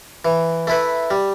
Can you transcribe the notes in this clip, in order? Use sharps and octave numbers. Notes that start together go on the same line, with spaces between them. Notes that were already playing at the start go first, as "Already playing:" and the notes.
E3
A3 E4 B4
G3